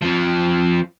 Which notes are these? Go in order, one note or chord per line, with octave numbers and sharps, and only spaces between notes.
F2 F3